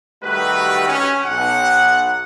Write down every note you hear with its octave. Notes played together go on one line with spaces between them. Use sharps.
D#3 G3 A3 F#4 G4 B4
C#4
B1 F#5